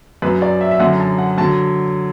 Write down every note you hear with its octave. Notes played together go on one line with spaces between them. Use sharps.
F#2 F#3 B4
D5
E5
E5
F#2 D3 F#3 F#5
A5
F#5
D3 F#3 A5